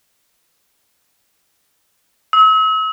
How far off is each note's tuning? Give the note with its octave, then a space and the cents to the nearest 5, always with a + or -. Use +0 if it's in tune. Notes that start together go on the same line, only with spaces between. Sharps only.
E6 -40